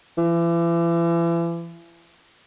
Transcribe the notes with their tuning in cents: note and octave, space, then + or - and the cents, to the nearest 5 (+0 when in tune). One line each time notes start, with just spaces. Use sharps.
E3 +40